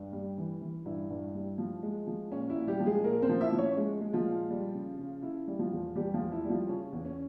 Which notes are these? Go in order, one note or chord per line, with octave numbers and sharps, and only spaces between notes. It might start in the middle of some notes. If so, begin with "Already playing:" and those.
Already playing: G2
G3
E3
E3
G2 E4
G2
G3
F3
G#3
F3
A#2 C#4
E4
A#2
G3 G4
F3
G#3 G#4
A#2 A#3 A#4
C4 C5
F3
E4 E5
F3
C#4 C#5
G#3
G#3
F3 F4
A#2
G3
C#3
C#3
C#3 E4
G3
F3 F4
E2
E2 G3 G4
F3 F4
E2
E4
G3
F3 F4
C#3 C#4
E2
C#4